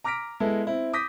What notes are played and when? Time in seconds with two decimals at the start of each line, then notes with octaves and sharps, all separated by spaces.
0.04 A#5 D6 F6 A#6 B6 D7
0.40 G#3 B3 E4 A4
0.67 C4 E4
0.93 D6 D#6 G6 A#6 B6